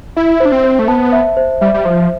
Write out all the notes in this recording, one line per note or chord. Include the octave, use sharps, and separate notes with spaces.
E4 E5
C5
D4
C4
C5
A3
B3 A5
E5
C5
G3 E5
G3
F3 C5